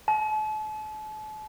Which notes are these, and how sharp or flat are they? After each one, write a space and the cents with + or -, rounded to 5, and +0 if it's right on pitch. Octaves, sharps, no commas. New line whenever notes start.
A5 -40